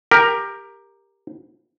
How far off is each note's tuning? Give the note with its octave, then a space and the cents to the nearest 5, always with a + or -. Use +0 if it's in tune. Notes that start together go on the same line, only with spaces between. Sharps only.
G4 +15 A#4 +0